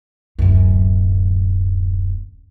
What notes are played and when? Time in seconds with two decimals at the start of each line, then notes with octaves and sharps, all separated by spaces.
0.39 D1 F#2